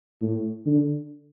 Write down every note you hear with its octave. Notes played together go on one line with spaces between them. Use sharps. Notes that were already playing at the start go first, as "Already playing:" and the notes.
A2
D3